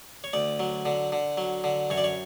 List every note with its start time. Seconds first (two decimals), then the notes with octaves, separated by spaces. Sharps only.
0.24 C#5
0.33 D2 D5
0.60 F#3
0.86 D3
1.12 D3
1.38 F#3
1.64 D3
1.90 F#2 C#5
1.97 D5
2.04 C#5